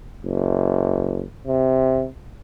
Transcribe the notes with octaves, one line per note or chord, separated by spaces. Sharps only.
F#1
C3